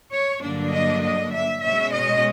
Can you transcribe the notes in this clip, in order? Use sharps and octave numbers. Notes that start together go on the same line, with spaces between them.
C#5
G2 D3 F#3 A#3 D4
D#5
D#5
E5
B2 G#3 C#4 E5
D#5